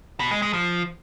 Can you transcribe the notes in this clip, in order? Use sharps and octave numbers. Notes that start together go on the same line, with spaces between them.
B2
G#3
G#3
F3